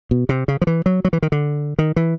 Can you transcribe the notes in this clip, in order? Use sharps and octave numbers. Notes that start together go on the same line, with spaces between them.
B2
C3
C#3
F3
E3
F#3
F#3
E3
D#3
D3
D#3
E3